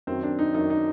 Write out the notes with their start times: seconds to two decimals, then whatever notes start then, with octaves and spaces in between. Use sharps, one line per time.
0.07 F#2 D#3 F#3 C4
0.23 D4
0.39 D#4
0.54 F#2 D#3 F#3 D#4
0.70 D#4